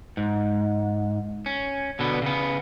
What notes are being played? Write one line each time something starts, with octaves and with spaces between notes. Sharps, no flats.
G#2
C#4
B2 D3 B3
C#3 B3